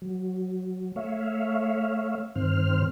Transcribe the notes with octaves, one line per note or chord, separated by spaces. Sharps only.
F#3
A3 C#5 E5 F5
G2 D#3 C4 C5 F6